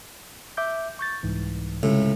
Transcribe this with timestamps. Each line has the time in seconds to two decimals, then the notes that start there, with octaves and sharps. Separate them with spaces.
0.57 E5 D6 G6
0.99 C#6 G6 A6
1.23 C2 G#2 E3
1.83 C#2 A2 C3